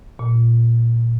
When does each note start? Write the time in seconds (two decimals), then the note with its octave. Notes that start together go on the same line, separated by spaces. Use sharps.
0.19 A#2